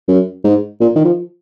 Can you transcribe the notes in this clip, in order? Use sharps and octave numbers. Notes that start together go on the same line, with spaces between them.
F#2
G#2
A#2
D#3
F3